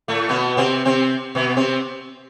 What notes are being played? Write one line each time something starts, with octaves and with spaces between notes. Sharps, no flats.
A2 A3
B2 B3
C3 C4
C3 C4
B2 B3
C3 C4